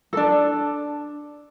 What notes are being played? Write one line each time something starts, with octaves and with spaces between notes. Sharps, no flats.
D4 A4